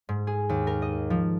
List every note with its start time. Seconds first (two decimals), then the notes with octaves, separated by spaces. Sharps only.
0.09 G#2
0.27 G#4
0.49 D#2
0.67 A#4
0.82 D#5
1.10 F3